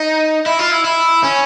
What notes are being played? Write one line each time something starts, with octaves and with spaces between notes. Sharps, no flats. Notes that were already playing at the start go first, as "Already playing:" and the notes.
Already playing: D#4
E4
F4
E4
E4
C#4